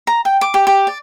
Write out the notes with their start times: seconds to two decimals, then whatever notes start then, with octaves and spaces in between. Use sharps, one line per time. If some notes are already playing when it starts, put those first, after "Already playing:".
0.07 A#5
0.25 G5
0.41 D6
0.54 G4
0.67 G4
0.87 D5